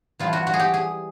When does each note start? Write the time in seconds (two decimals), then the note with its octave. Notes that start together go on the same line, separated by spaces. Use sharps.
0.19 E3 G3 B3 D4 F4
0.33 F#4
0.47 F#4
0.54 G#4
0.59 G4
0.74 G#4